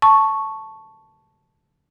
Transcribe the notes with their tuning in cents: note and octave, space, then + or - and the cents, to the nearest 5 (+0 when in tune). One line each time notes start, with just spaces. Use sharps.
A5 +0 C#6 +0